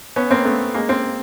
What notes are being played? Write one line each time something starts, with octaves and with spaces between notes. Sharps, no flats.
B3 C#4
A#3 C4
A3 B3
G#3 A#3
A#3 C4